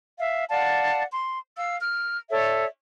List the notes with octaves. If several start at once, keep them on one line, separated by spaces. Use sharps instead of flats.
E5 F5
D5 F5 F#5 A5
C6
F5 E6
F6
A4 C#5 D5 E5